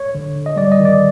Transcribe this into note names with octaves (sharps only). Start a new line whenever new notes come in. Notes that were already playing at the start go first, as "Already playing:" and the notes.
Already playing: C#5
D3
D3
D#5
G3 D5
D#5
D#3
D5